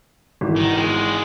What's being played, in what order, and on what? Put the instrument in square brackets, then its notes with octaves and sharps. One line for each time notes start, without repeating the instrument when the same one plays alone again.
[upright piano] G#1 E3
[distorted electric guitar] D#3
G#3 B3